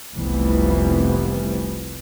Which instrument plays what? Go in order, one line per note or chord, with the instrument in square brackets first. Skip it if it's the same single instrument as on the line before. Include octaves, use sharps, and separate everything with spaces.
[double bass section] F1 C2 E3 F3 G3 B3